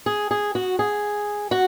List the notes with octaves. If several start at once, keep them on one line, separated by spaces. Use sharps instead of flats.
G#4
G#4
F#4
G#4
F#4